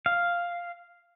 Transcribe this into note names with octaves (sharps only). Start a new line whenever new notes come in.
F5